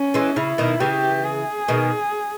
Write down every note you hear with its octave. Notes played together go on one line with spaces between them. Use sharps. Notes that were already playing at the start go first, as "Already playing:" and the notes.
Already playing: C#4
E3 G#3
C#3 E4
B2 D#3
C#3 E3 G4
G#4
B2 D#3